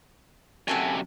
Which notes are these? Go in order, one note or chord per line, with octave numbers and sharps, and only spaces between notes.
F#2 C3 F#4 A4 G#5